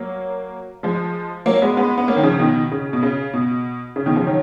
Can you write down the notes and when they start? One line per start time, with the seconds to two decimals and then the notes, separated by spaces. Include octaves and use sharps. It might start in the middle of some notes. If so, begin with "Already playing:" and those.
Already playing: F#3 A#3
0.83 F3 G#3
1.46 F#3 A#3
1.62 G#3 B3
1.77 G#3 B3
1.98 B3
2.08 A#3 C#4
2.16 D#3
2.23 C#3 F3
2.39 B2 D#3
2.71 C#3
2.93 B2
3.03 C#3
3.34 B2
3.96 C#3
4.06 B2 D#3
4.16 C#3 F3
4.27 D#3 F#3